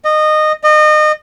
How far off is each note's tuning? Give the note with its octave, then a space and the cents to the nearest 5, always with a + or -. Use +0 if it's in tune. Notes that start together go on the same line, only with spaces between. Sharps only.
D#5 -20
D#5 -30